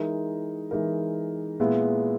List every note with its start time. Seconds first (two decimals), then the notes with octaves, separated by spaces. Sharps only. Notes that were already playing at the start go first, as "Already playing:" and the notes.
Already playing: E3 G#3 D#4 A#4
0.71 E3 G#3 D#4 A#4
1.60 A#2 G#3 B3 E4